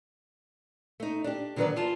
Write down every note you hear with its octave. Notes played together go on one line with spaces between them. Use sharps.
A3 D#4
D4 G4
D3 D#3 F#3 A#4 B4 D5
E3 F4 A5